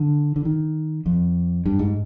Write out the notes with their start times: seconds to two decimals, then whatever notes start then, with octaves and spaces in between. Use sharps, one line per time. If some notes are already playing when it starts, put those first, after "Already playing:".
Already playing: D3
0.36 D3
0.45 D#3
1.06 F2
1.65 G2
1.79 G#2